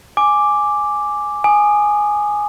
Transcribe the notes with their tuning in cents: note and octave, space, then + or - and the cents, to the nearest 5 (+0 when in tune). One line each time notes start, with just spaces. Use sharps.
G#5 +0 D6 +0
G#5 +0 D#6 -20